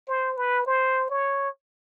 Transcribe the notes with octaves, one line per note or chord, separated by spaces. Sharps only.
C5
B4
C5
C#5